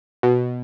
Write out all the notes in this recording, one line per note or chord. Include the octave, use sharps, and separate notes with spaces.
B2